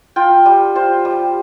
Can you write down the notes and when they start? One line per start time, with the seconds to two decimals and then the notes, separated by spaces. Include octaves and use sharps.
0.16 F4 G5
0.46 G3
0.75 F4 C5
1.05 G3